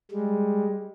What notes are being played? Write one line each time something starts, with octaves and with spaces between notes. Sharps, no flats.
G3 G#3